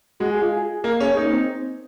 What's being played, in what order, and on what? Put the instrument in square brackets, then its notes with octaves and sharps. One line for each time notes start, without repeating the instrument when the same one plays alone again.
[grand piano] G#3 [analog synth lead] F#4
[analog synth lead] G#4
F4
G#4
[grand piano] A#3 [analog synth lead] A#4
[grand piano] C#4 [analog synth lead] G#4
[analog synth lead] A#3 [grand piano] D#4
[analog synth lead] C4